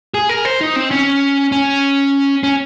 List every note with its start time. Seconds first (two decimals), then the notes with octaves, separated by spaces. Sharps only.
0.14 G#4
0.29 A#4
0.45 C5
0.61 D#4
0.76 C4
0.91 C#4
1.52 C#4
2.43 C#4